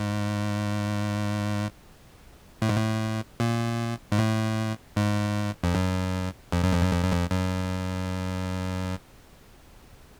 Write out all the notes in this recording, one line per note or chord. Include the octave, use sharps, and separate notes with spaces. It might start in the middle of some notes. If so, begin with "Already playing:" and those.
Already playing: G#2
A2
G#2
A2
A#2
G#2
A2
G#2
F2
F#2
F2
F#2
F2
F#2
F2
F#2
F2
F#2